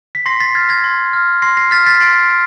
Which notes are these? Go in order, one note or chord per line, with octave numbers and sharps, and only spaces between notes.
B6
C6 A#6 C7
A6 B6
F6 G#6 A#6
G#6 A#6
C6
F6
C6 A#6 C7
A#6 C7
F6 A6 B6
A6 B6
C6 C7 D7
F6